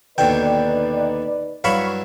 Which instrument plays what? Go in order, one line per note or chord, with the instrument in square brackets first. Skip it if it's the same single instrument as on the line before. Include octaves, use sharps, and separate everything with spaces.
[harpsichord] D#2 B2 D3 [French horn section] D#4 B4 D5 [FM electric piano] G5
[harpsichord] G2 F#3 E4 [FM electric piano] F5 B5 C#6